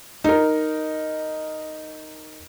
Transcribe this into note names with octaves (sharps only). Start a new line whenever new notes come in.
D#4 A#4